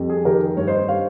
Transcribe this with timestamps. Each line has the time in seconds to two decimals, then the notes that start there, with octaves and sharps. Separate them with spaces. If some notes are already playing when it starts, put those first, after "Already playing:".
Already playing: F2 G3
0.10 G#4
0.25 D#3 G4 A#4
0.57 G2 C#5
0.67 C5 D#5
0.88 G3 C#5 F5